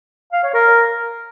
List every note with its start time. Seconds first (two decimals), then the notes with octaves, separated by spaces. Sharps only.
0.32 F5
0.43 C#5
0.54 A#4